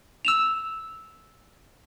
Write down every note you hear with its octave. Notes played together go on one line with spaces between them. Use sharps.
E6 E7 F7